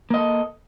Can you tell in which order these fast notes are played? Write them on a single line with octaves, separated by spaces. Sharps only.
A#3 D#5 A4